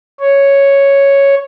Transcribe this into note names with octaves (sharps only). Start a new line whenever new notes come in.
C#5